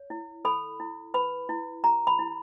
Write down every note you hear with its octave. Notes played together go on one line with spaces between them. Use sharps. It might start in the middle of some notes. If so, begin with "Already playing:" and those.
Already playing: C#5
E4
A4 B5
E4
B4 B5
E4
G4 A#5
B5
E4